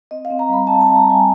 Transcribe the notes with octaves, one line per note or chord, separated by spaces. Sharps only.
C4 D#5
F5
C4
A#5
G3 B5
C4 A5
A5
G3
A#5
G3 G#5